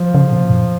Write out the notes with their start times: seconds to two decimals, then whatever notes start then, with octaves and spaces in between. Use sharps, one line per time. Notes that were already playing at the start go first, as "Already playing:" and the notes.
Already playing: F3
0.14 C#3
0.32 A#2
0.50 F#2